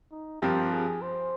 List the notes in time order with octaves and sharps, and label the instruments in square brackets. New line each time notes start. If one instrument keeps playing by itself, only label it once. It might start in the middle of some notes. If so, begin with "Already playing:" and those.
[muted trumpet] D#4
[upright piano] G2 F3 C4 F4 A#4 [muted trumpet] G4
[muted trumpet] G#4
C5